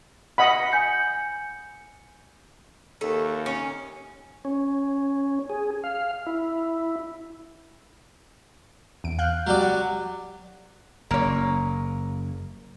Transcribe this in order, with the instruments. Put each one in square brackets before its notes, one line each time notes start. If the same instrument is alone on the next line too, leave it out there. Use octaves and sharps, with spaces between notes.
[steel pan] D#5 F#5 B5
[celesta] G#5 G6 C#7
[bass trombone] D#2 [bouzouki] A3
[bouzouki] C#4
[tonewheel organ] C#4
G#4
F5
E4
[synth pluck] E2 D7
F5 F#6 G6
[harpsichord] F#3 G3 D5
[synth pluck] F#5
[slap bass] F#1 [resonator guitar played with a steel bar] A#3 C#5